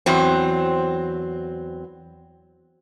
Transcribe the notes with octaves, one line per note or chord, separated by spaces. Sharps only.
E2 F#3 C4